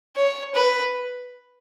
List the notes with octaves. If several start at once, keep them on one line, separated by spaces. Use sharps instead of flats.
C#5
B4